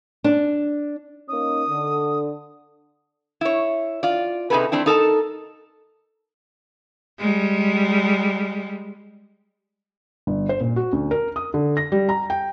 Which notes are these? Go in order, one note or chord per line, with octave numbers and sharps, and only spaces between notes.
D4
A#3 C#4 D#4 D#6
D3
E4 C#5
F4 D5
C3 D#4 E4 G#4 A4 B4
A3 C4 D4 E4
D#4 A4 A#4 A5
G3 G#3
G1
C5
A#2
F#4
D2
A#4
D#6
D3
A#6
G3
A#5
G5